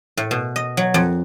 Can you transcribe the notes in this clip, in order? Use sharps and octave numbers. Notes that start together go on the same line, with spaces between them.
A2
B2
D#5
F#3
F2